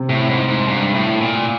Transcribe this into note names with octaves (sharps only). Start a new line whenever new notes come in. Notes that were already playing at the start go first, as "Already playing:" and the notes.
Already playing: C3
A2
G#2
G#2
G2
A2
A#2